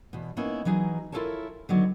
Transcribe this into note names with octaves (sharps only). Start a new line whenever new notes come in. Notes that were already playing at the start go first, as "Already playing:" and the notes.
E2 B2
A#3 B3 C#4 D#4 E4
E3 F#3 D#4 G#4
E4 F4 A4 A#4 C#5 A5
D3 D#3 F#3 B3